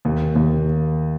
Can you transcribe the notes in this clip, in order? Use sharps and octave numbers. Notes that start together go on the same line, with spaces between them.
D#2
D#2